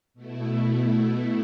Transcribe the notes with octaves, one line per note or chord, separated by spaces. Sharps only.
B2 A3 E4